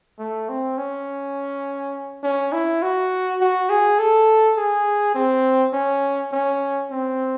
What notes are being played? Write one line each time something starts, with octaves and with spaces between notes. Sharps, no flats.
A3
C4
C#4
C#4
E4
F#4
F#4
G#4
A4
G#4
C4
C#4
C#4
C4